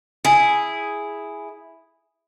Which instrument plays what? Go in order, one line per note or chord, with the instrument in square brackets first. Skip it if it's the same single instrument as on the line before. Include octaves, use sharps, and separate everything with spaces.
[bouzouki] E4 G#4